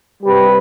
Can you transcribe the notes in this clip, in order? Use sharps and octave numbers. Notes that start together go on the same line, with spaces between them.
C3 G3 G4 B4